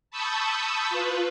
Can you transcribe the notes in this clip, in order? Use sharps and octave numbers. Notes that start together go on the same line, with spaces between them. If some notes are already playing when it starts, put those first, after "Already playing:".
A5 B5 C#6 D#6 E6 G6
F4 B4